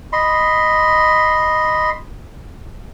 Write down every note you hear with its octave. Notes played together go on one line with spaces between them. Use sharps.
D#5 B5 C6